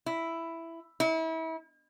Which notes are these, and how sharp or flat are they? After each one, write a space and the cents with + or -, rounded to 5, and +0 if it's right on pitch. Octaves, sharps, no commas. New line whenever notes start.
E4 +5
E4 -35